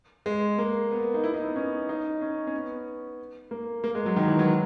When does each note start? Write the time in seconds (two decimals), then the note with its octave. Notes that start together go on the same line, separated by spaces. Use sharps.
0.26 G#3
0.58 A#3
0.91 B3
1.14 D#4
1.24 E4
1.34 D#4
1.44 B3
1.56 C#4
1.89 D#4
2.21 C#4
2.47 C#4
2.54 B3
3.51 A#3
3.84 A#3
3.95 G#3
4.06 F#3
4.16 D#3
4.28 E3
4.39 F#3